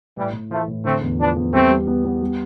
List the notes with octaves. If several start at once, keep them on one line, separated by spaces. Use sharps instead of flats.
A2 E3 G3
A2
E3 F3 A3
A2
D3 A3 C4
E2
F3 B3 D4
E2
G3 A3 C4
G3
B3
B3
G3